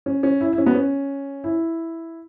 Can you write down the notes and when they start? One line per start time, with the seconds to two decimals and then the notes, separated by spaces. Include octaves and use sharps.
0.06 C#4
0.23 C#4
0.41 E4
0.53 E4
0.58 C#4
0.66 B3
0.75 C#4
1.44 E4